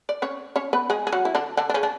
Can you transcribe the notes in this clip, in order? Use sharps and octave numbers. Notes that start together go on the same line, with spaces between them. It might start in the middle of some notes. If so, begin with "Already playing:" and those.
D5
C#4 C#5
C#4 C#5
B3 B4
G#3 G#4
G#4
F#3 F#4
E4
D3 D4
D3 D4
D4
C#3 C#4
D4